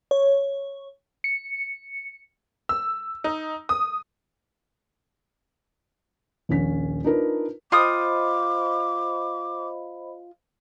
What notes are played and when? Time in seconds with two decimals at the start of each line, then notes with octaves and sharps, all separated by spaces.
0.11 C#5
1.24 C#7
2.69 E6
3.24 D#4
3.69 D#6
6.49 D#1 A#1 C#4 B6
7.04 D4 D#4 F4 A#4 B4
7.72 F4 C5 D#5 G5 B5 D6 D#6